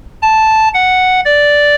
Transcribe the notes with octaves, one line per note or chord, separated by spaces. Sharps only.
A5
F#5
D5